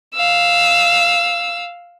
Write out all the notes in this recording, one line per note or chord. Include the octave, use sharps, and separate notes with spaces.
F5 E6